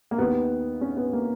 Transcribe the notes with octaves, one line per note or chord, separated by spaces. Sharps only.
A#3
D#2 D#3 B3
C#4
B3
A#3